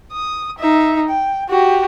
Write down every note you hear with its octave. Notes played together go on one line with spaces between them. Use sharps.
D#6
D#4 E5
G5
F#4 G4